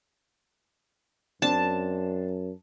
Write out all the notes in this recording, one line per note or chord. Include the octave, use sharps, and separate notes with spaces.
F#2 C4 D4 A5